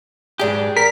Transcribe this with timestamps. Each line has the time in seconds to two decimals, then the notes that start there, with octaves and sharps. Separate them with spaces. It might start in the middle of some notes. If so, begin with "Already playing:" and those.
0.40 G#2 D4 G4 G#4
0.77 A#4 B6